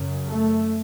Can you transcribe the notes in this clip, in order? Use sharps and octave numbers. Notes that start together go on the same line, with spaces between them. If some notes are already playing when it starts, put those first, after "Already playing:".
Already playing: F#2 C#3
A3